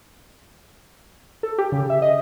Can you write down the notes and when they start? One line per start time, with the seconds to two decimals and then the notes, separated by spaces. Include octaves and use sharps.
1.43 A4
1.58 G4
1.72 C#3
1.90 E5
2.02 D#5